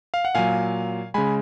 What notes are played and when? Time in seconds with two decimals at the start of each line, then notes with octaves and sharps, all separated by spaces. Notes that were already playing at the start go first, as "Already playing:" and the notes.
0.14 F5
0.25 F#5
0.35 A#2 F#3 F5 G#5
1.14 C#3 G#3 G#5 B5